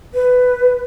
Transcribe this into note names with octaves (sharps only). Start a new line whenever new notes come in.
B4